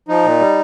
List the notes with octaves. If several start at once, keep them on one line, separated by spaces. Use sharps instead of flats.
F3 D#4
A#2
G3